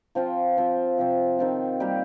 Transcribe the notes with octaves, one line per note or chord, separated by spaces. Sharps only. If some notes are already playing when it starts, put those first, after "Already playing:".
F3 C4 F4
F3 C4 F4
C3 F3 C4
D#3 C4 F4
G3 A#3 G4